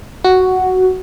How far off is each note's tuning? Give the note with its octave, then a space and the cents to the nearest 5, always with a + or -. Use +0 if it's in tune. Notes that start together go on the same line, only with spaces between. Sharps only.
F#4 +5